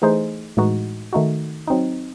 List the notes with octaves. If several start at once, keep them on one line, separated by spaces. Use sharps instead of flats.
E3 A3 D#4 G#4 C5
A2 E3 G#3 D#4 F#4
D#3 A3 D#4 F#4
F#3 C4 D#4